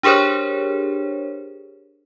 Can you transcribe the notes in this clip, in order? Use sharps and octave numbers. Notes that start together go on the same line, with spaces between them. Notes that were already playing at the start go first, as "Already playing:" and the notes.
D4 G4 G#4 A#4 C5 C#5